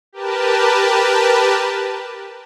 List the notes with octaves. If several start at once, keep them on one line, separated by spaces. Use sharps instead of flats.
G4 A#4 B4 A5